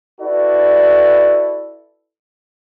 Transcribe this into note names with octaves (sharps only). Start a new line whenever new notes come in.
E4 F#4 A4 B4 D5